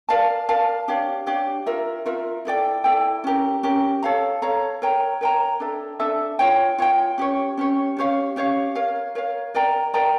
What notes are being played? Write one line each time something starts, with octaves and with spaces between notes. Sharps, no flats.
A#4 D5 F5 A5
A#4 D5 F5 A5
D4 G4 C#5 F5
D4 G4 C#5 F5
F4 A#4 E5
F4 A#4 E5
E4 A4 D5 G5
E4 A4 D5 G5
C#4 G4 A#4
C#4 G4 A#4
A4 C#5 F5 A#5
A4 C#5 F5 A#5
A#4 C#5 G5 A#5
A#4 C#5 G5 A#5
D4 A4 E5
D4 A4 E5
F4 C#5 G5
F4 C#5 G5
C#4 G4 C#5
C#4 G4 C#5
C#4 G4 C#5 F5
C#4 G4 C#5 F5
A#4 C#5 F5
A#4 C#5 F5
A#4 D5 G5 A#5
A#4 D5 G5 A#5